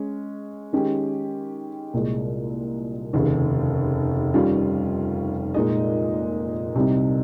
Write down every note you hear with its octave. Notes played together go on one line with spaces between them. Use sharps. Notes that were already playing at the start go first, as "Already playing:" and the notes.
Already playing: G#3 C#4
D#3 G#3 C#4 G4
C2 A#2 G#3
F1 D#2 C#3
D#3 G3 C#4 F4
A#2 G#3 D#4 G#4 D#5
C2 C3 G3 C4 D#4